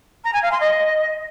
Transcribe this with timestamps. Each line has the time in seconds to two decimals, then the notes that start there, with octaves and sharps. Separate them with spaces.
0.24 A#5
0.33 G#5
0.42 F5
0.51 C6
0.60 D#5